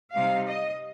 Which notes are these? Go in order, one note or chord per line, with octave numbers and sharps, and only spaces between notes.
C3 G3 C4 D#4 F5
D#5